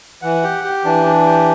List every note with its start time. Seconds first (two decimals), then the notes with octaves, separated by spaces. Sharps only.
0.22 E3 F#5
0.44 G4
0.64 G4
0.84 E3 D4
1.06 D4
1.26 G4